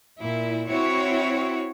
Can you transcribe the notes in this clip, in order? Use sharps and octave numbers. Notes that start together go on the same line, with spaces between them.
A#2 E4
C4 E4 F#4 C#5